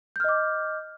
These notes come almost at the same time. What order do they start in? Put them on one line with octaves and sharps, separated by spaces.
G6 F6 D#5 D6